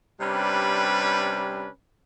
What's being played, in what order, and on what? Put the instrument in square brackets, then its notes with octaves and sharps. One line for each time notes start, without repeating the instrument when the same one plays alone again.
[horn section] C3 G3 C#4 D4 B4